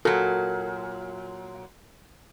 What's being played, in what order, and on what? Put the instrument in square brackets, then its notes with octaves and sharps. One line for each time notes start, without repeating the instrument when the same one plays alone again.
[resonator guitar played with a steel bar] A#2 F#3 [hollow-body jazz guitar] F#4 A4 A#4